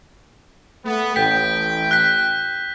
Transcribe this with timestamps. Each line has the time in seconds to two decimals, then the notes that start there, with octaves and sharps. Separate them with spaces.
0.84 A3 B3
1.16 A1 G5 G6 B6
1.91 F#6 B6